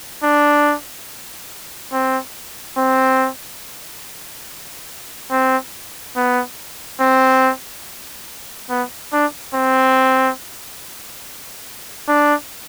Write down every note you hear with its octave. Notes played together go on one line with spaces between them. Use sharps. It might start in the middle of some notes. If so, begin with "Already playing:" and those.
D4
C4
C4
C4
B3
C4
B3
D4
C4
D4